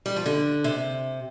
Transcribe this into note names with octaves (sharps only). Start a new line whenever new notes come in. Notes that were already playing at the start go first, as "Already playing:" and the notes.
G3
F3
D3
C3